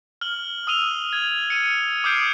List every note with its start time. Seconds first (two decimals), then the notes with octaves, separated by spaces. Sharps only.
0.21 F6 F#7 G7
0.67 D#6 E6 D#7 F7 G7
1.13 G#6
1.50 C#7 D#7
2.04 D6 D#6 F6 G6 C7 D7